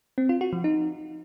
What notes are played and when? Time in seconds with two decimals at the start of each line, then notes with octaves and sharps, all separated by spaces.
0.18 C4
0.29 F4
0.41 F#4
0.53 F3
0.64 D#4